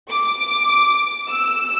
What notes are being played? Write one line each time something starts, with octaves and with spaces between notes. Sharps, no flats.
D6
E6